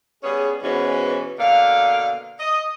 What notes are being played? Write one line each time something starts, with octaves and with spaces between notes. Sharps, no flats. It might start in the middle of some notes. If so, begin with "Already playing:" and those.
G3 B3 C#4 G#4
G#2 B2 E3 B3 C#4 F#4
B2 D3 A#3 F5
D#5